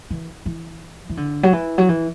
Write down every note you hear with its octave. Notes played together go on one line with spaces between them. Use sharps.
E3
E3
E3
D3
F#3
E3
F#3
E3